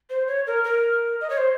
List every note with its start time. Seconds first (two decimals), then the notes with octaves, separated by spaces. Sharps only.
0.09 C5
0.27 C#5
0.46 A#4
0.64 A#4
1.20 D#5
1.29 C#5
1.37 C5